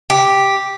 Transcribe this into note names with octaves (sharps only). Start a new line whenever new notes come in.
G4